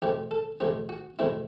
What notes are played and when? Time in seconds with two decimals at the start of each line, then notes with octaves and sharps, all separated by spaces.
0.02 E2 B2 A3 C4 G4
0.31 A4
0.60 E2 B2 A3 C4 G4
0.89 F#4
1.19 E2 B2 A3 C4 E4